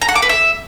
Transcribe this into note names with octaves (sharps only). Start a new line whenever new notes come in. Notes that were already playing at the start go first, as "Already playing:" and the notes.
A#5
F#5
D6
B4
E5